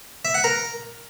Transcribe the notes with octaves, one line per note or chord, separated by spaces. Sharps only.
E5
F#5
A#4